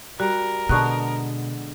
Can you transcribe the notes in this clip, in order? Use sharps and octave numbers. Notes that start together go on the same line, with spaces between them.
G3 F#4 A#4
B2 D3 G#3 B3 A5 C#6 F#6